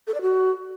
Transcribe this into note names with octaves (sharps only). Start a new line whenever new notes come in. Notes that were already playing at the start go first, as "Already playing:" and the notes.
A4
D5
F#4